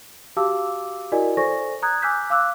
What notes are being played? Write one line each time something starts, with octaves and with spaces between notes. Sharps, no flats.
F#4 G4 F5 A5 D6 E6
E4 F#4 A#4 D5 D#5 G#5
A4 C5 D5 G#5 C#6 A#6
A#5 D#6 F#6 G#6
G#5 D6 E6 F#6 G6 B6
F5 D6 E6 F#6